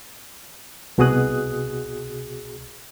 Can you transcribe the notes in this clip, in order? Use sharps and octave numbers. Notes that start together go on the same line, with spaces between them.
C2 B2 F#4 G#4 D#6 F#6